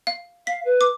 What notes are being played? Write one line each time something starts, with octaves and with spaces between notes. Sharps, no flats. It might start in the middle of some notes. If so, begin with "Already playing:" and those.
F5
F5 B6
B4
D6